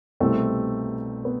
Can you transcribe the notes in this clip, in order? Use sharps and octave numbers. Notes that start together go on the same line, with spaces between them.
C2 B2 G3 A3 C4
B3